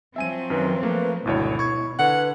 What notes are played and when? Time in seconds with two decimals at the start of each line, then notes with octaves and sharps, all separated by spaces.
0.16 F3 F#3 C4 E5 G#5 D#7
0.50 F#2 D#3 B4
0.83 A3 A#3 B4
1.25 G#1 D2 B2 E4 C#5
1.59 C#6 G#6
1.99 D3 B4 F#5